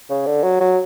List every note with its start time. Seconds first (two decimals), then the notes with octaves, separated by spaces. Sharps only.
0.09 C#3
0.26 D3
0.43 F#3
0.60 F#3